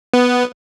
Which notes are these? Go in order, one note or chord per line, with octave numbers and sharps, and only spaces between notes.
B3